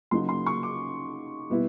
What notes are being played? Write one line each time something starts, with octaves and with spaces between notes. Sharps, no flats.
C#3 F#3 A#3 D#4 C6
C6
C#6
D6
B2 G3 B3 E4